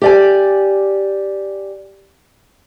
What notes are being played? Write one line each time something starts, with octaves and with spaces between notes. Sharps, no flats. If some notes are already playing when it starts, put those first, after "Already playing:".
G4 D5 G#5